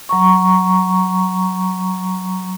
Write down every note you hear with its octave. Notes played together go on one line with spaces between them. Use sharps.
F#3 A#5 C#6